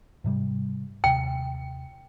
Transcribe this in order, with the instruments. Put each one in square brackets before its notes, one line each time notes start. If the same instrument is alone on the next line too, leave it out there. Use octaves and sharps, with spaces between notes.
[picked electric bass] G#2 C3 G3
[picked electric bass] D#2 C3 [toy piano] G5